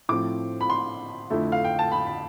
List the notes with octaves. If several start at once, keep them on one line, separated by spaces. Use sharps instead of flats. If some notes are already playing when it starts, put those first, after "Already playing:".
A2 F3 C4 D6
B5
C6
F2 D3 A3 E4
F5
G5
A5
B5
B5